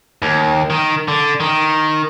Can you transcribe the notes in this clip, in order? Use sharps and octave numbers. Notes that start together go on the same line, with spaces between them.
D#2
D#3
D3
D#3